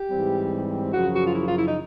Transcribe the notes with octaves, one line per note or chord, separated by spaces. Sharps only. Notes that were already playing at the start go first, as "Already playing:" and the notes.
Already playing: G4
G#2 E3 G3 C4
F#2 C#3 F3 F#4
F#4
F4
E4
F4
E4
D#4